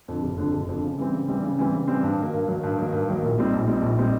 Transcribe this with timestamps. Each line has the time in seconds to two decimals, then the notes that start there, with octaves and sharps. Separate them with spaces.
0.08 F2 D3
0.23 F#1
0.38 F2 D3
0.53 F#1
0.69 F2 D3
0.83 C#3
0.98 E3 G3 C4
1.13 C#3
1.28 E3 G3 C4
1.43 C#3
1.59 E3 G3 C4
1.73 C#3
1.87 E3 G3 C4
2.03 G2
2.18 D#3 F#3 A#3
2.33 G2
2.48 D#3 F#3 A#3
2.63 G2
2.77 D#3 F#3 A#3
2.92 G2
3.08 D#3 F#3 A#3
3.22 A#1
3.38 A#2 G3 C4 D#4
3.53 A#1
3.67 A#2 G3 C4 D#4
3.82 A#1
3.97 A#2 G3 C4 D#4